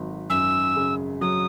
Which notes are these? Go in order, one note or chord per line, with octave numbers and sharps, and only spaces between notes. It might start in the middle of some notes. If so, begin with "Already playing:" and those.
Already playing: G#1 F#3
F#2 E6
C#3
F#3 D#6